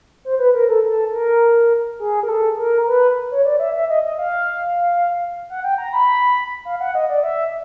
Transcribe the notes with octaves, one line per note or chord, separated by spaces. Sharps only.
C5
B4
A#4
A4
A4
A#4
G#4
A#4
A4
A#4
B4
C#5
D5
E5
E5
D#5
D#5
F5
F#5
G5
A#5
B5
F5
F#5
D#5
D5
E5